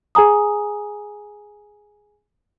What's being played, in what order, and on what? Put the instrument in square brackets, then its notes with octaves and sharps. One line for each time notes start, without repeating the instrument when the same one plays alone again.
[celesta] G#4 G#5 A#5 D#6